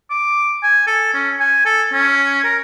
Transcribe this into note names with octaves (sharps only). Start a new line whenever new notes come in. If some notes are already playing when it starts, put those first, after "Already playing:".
D6
G#5
A4
C#4
G#5
A4
C#4
A#4